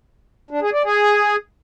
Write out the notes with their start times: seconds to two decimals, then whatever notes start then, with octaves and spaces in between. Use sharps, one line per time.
0.51 D4
0.62 G#4
0.73 D5
0.84 G#4